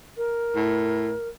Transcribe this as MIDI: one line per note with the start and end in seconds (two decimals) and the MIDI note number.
0.17 1.28 70
0.56 1.16 45